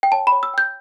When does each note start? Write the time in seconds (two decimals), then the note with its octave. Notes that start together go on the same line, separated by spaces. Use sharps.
0.03 G5
0.12 C#5 A5
0.27 B5
0.32 C#5
0.43 E6
0.54 G5 G6